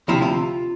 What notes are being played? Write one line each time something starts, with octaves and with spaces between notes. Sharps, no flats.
D2 C3 F3 E4
F4